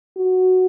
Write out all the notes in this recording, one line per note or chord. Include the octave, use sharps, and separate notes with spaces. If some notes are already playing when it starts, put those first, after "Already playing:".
F#4